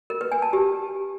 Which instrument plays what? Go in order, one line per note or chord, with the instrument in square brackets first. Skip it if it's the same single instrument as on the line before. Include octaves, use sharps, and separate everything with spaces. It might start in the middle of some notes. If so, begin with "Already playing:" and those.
[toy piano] A#4
B4
G#5
A5
G4